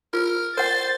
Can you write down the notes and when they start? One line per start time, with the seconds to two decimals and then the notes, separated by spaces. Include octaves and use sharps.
0.13 F4 A#4
0.57 A#4 C5 F#5 A6